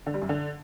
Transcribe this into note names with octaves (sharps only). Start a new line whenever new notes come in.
D3
G3
F#2
D3